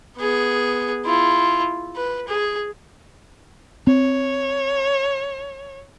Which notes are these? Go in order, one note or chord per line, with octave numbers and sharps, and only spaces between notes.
B3 G#4
E4 F4
B4
G#4
C4 C#5